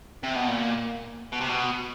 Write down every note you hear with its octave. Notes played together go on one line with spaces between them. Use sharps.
C3
B2
A#2
B2
C3
B2